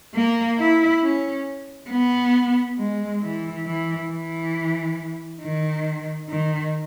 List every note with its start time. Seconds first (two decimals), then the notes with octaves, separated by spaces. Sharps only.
0.15 A#3
0.58 E4
1.02 C#4
1.90 B3
2.78 G#3
3.22 E3
3.66 E3
4.10 E3
5.42 D#3
6.29 D#3